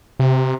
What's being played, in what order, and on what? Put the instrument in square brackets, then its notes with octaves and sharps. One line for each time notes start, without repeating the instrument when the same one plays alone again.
[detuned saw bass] C3